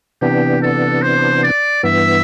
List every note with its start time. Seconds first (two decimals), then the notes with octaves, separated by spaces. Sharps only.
0.21 C3 E3 B3 D4 G4
0.62 A4
1.02 C5
1.43 D5
1.83 G2 E3 B3 E5